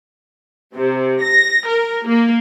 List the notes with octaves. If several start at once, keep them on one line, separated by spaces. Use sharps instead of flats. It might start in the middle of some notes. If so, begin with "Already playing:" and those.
C3
A#6
A#4
A#3